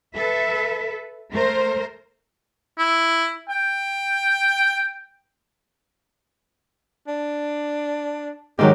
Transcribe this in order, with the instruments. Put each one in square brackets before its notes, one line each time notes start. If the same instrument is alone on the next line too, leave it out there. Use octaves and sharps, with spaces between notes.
[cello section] A4 B4 E5
A3 A#4 C5
[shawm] E4
G5
[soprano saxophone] D4
[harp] G#2 D#3 F#3 [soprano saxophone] G4